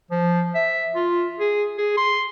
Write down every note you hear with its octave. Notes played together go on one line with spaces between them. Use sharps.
F3
E5
F4
G#4
G#4
C6